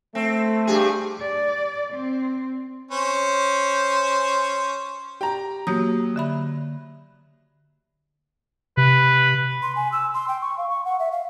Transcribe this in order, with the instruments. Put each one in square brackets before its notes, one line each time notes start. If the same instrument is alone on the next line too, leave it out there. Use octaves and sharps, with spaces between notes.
[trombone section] A3 [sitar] C4
[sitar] G2 G#4 [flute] G4
[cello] D5
C4
[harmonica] C#4 C5
[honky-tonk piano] G4 A#5
[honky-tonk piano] F#3 [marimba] A#3 G4 D#6
[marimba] D3 E5 B5
[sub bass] C3 [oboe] B4
[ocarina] C6
G#5
E6
C6
G5
C#6
F5
C#6
F#5
E5
F5